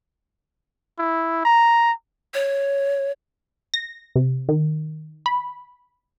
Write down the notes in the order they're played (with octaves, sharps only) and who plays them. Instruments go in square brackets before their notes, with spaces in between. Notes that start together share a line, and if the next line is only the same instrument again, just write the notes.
[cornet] E4
A#5
[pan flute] C#5
[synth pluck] A#6
C3
D#3
B5